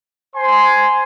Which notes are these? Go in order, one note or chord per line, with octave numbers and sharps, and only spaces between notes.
C5 G#5 C6